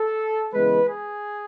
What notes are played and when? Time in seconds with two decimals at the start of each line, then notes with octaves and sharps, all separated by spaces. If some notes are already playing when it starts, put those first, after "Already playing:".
Already playing: A4
0.53 C#3 E3 G#3 B3 B4
0.89 G#4